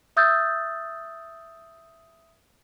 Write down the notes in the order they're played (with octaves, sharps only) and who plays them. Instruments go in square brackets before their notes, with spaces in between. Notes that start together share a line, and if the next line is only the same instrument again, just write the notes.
[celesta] E5 D#6 E6 G6 A6